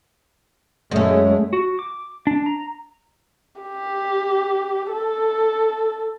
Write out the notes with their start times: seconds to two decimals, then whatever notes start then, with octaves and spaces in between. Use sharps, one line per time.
0.91 F#2 G#3 A3 C#4
1.53 F#4
1.79 D6
2.27 D4
2.46 A#5
3.62 G4
4.92 A4